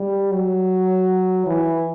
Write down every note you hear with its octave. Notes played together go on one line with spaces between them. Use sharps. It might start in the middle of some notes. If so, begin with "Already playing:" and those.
Already playing: G3
F#3
E3